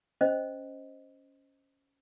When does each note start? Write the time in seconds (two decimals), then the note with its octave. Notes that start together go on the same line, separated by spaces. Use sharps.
0.21 C#4 C5 D#5